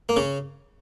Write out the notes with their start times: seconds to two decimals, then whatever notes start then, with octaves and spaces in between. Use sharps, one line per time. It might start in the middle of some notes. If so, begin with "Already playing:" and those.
0.09 A#3
0.16 C#3 C#4